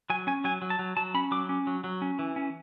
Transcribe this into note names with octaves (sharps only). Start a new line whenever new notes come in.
F#3 G#5
C#4 G#5
F#3 G#5
F#3
A5
F#3
F#3 A5
C#4 B5
F#3 D6
C#4
F#3
F#3
C#4
E3
C#4